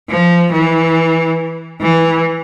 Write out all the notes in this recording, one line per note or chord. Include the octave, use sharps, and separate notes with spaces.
F3
E3
E3